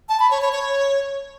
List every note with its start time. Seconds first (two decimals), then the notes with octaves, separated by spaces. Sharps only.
0.09 A5
0.20 B5
0.31 C#5
0.42 C#5
0.52 C#5